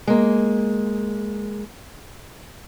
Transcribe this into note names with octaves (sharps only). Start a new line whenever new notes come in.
G#3 A#3